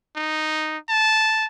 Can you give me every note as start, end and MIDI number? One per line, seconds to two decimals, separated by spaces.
0.16 0.77 63
0.89 1.45 81